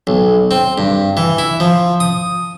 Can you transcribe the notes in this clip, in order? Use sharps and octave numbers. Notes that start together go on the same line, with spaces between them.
B1
C4
G2
E3
E4
F3
D#6